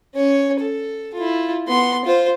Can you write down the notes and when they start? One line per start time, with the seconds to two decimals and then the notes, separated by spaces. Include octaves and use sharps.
0.15 C#4 C#5
0.60 A4
1.14 E4 F4
1.67 B3 C6
2.05 F4 C5